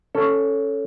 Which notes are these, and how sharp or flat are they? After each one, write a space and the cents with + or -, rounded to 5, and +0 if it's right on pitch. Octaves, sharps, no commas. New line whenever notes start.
C#4 +0 A4 +0